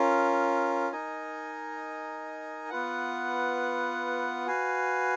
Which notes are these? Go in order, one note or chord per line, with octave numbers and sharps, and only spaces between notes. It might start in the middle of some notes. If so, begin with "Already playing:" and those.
Already playing: C#4 F4 A#4
D#4 A#4 D#5 G#5
B3 F4 B4 F#5
F#4 B4 F5 G#5